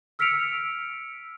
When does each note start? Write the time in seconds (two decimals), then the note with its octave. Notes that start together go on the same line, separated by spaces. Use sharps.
0.19 E6 F6 B6 C#7 D7 F7